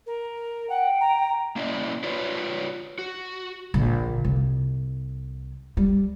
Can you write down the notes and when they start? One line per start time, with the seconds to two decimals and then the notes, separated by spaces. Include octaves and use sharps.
0.07 A#4
0.70 F#5 G5
1.01 A#5
1.56 A#3 C#4 E4 D5 D#5
2.04 F4 B4 C#5 D5
2.99 F#4
3.74 A#1 D3
4.25 C2
5.77 G3